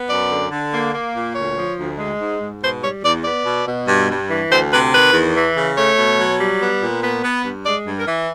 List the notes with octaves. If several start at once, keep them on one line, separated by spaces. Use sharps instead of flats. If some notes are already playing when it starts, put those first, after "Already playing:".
Already playing: B3
F#2 D5
D3
D3
A#3
A#3
A#2
D2 C#5
F3
D2
G#3
G#2
G#2
B2 C5
G3 C#5
E2 D5
B3 D5
B2
B2
G2
G2
E3
D2 C5
C3 B4
D#3 B4
E2
E3
C#3
A3 C#5
B2
F#3
G3
B3
A#2
B3
B3
G2
G#3 D5
G2
A#4
E3